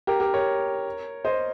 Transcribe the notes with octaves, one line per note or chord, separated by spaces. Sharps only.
G4 A#4
G4 A#4
A#4 C#5
C5 D#5